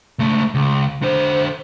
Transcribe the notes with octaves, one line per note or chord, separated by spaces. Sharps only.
C#2 A3
C#2
D3 C5